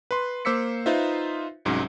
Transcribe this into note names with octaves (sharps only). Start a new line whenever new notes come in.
B4 C6
A#3 C5 D6 E6 B6 C#7
D#4 F4 B4 C5 E5
C2 G#2 F#3 C#4